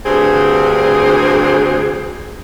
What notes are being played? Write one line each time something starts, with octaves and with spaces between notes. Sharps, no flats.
D2 G2 C4 G#4